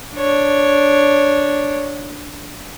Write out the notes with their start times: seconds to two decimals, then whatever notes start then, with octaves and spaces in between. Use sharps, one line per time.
0.15 D4 C#5